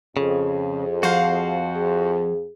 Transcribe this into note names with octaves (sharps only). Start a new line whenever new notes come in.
F2 C#3 G#4
F3 F#4 C5 F5 F#5
G#4